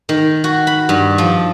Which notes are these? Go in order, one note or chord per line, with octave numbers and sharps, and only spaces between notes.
D#3
F#4
B5
G2
F3